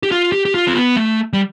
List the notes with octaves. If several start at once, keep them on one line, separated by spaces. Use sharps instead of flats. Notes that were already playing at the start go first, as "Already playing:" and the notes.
G4
F4
G4
G4
F4
C4
B3
A3
G3